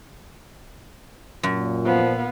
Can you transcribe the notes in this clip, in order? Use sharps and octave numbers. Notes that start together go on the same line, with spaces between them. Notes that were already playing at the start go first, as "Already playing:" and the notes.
F#2 A#2
F3 B3 F5